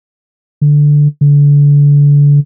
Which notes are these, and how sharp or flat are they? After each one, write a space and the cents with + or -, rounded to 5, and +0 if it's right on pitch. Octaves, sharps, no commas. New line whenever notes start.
D3 +0
D3 -30